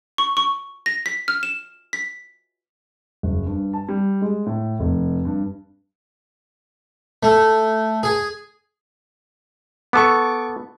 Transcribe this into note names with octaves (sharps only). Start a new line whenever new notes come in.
C#6
C#6
A#6
B6
F6
E7
B6
F#1
G2
A5
G3
G#3
A2
F1
G2
A3
G#4
B3 A4 C#6 D6